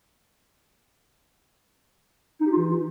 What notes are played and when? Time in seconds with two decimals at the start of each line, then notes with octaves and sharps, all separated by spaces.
2.41 D#4
2.46 G4
2.52 F4
2.57 E3